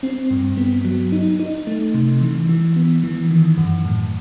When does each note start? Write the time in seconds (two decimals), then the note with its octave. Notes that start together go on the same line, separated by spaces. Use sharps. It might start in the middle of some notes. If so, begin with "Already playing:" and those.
0.03 C4
0.31 G2
0.57 B3
0.85 F#3
1.12 D#4
1.40 D#4
1.67 A3
1.94 C3
2.21 E3
2.49 E3
2.76 B3
3.04 E3
3.31 D#3
3.58 F#2
3.85 A2